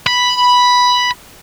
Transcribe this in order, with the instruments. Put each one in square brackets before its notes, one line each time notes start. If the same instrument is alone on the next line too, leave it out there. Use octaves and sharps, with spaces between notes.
[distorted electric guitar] B5